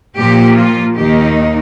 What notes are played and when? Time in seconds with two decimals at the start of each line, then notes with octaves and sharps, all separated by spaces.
0.17 A#2 F3 A#3 G4
0.57 F4
0.97 D#2 D#3 A#3 D#4 G4